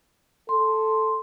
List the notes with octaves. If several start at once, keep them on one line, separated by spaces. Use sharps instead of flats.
A4 C6